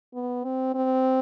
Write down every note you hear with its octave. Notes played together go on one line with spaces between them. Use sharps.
B3
C4
C4